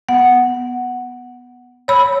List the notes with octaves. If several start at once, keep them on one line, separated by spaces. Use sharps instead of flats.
B3 F#5
C#5 B5 E6